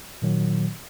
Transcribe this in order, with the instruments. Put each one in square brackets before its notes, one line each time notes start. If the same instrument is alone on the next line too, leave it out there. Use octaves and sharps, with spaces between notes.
[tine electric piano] A#2 D#3 F#3